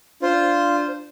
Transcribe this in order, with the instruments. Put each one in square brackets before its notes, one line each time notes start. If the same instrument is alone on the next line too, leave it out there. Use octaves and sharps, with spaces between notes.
[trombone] D4 [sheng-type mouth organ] F4 [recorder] C5